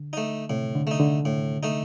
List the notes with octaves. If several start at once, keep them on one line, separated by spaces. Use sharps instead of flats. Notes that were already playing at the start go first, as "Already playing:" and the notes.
Already playing: D3
A3 D#4
A2 C3
D3
A3 D#4
D3
A2
A3 D#4